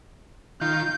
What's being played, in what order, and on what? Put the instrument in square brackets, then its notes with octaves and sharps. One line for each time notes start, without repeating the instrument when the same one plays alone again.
[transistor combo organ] D#3 F4 [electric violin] G6